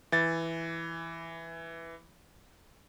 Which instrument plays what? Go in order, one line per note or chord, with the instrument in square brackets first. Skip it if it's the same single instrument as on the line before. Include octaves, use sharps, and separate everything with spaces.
[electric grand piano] E3 A6